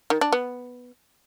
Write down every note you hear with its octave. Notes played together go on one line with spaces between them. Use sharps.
D#3
D4
B3